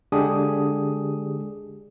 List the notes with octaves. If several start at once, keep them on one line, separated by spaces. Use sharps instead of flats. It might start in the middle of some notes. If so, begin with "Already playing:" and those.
D3 G#3 D4 G4 G#4 D#6